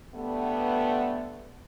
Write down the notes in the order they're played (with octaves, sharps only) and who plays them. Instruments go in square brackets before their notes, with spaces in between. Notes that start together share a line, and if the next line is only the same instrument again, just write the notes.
[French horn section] D3 G3 A3 B3